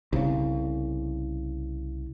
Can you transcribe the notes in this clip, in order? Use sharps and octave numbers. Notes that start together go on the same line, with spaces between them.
C2 C#3